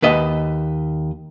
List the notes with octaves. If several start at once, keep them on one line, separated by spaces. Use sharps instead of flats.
D#2 B4 D#5